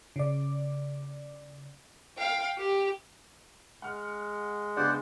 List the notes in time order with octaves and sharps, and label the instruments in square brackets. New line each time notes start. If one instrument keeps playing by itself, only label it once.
[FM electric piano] C#3 D5
[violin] F5 G5
G4
[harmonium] G#3 [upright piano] F#5 F6
[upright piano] C#3 B3 D4 [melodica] C5 D5 F#5